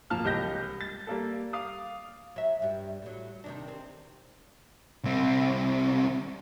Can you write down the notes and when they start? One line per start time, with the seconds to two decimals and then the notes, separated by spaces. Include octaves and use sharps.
0.10 D1 F3 A#3 A5 F6
0.23 E1 C2 G4 D#5 G6 A#6
0.81 A6
1.07 G3 A#3 A4
1.53 F5 D6 D#6
2.36 F#3 E5
2.62 G2 G3
3.02 A2 F#3
3.44 C3 D#3 D4
3.68 C4
5.04 C2 C4